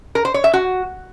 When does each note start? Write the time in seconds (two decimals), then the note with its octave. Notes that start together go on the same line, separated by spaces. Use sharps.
0.15 A#4
0.25 C5
0.34 C#5
0.44 E5
0.53 F#4